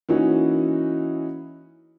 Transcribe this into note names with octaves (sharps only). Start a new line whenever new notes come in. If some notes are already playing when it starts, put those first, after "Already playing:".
E3 A#3 C#4 D#4 F#4